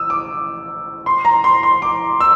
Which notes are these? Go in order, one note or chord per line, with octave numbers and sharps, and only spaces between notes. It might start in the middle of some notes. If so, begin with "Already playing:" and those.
Already playing: D#6 E6
D6
C6
A#5
C6
C6
D6
E6